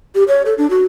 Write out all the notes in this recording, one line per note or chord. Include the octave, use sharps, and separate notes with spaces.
G4
C#5
A4
D4
F#4